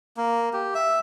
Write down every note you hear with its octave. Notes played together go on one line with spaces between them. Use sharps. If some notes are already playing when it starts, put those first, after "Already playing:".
A#3
G4
E5